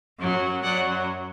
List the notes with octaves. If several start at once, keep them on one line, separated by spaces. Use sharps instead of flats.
F#2 F#3
F#2 F#3 D5 F#5